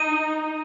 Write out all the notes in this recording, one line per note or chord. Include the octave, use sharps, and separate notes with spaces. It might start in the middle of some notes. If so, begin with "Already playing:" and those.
Already playing: D#4 D#7